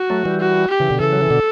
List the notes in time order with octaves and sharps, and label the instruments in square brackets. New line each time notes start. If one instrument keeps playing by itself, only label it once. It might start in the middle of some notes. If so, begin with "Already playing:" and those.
Already playing: [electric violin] F#4
[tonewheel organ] F#3 A3
E3 G3
[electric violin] F#4
G4
[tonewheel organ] C#3 E3
B2 D3
[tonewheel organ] C#3 E3 [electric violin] A4
[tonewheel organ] F#3
E3
B2 D3